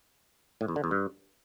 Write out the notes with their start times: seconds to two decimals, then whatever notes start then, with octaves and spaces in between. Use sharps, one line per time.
0.61 A2
0.68 E2
0.76 D3
0.84 E2
0.91 G2